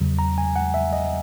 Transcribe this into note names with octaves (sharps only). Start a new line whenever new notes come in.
E2 C#3 F#3
A#5
G#5
F#5
E5
D#5